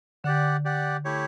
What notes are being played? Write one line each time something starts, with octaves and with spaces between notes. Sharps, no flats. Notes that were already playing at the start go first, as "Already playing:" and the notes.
D3 G4 D5 F#5
G4 D5 F#5
A3 E4 G4 C#5